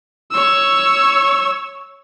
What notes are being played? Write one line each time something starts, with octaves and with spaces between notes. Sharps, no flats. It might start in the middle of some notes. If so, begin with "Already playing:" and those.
C#5 E6